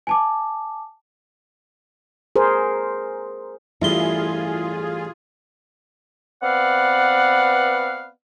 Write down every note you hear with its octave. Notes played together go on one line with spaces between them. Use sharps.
G#5 A5 D6
G#4 A#4 C5
A1 G2 E4 F4 G#4 C6
B3 C4 B4 D5 F5 F#5